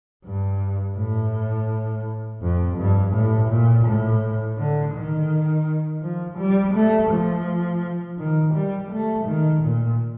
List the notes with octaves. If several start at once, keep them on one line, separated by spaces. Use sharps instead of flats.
G2
A2
F2
G2
A2
A#2
A2
D3
D#3
F3
G3
A3
F3
D#3
G3
A3
D#3
A#2